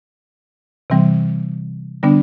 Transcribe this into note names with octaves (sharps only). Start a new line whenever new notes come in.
C3 E3 G3 C4
D3 G3 B3 D4